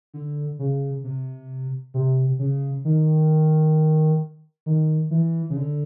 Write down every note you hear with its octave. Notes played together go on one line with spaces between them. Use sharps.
D3
C#3
C3
C3
C#3
D#3
D#3
E3
C#3
D3